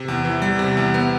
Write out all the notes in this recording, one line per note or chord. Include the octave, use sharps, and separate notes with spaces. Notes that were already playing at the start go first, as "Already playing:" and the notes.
Already playing: C3
E2
E3
G3
C3
E2
B3